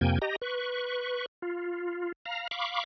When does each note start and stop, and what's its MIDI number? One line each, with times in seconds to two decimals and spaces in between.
0.01 0.19 41
0.01 0.19 48
0.01 0.19 58
0.01 0.19 79
0.01 0.19 80
0.22 0.36 67
0.22 0.36 75
0.22 0.36 82
0.42 1.26 71
0.42 1.26 85
1.42 2.12 65
2.26 2.47 77
2.26 2.47 82
2.51 2.84 77
2.51 2.84 83
2.51 2.84 85
2.51 2.84 86